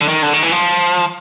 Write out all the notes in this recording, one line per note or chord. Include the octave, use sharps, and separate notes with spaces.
D3
D#3
D3
D#3
E3
F3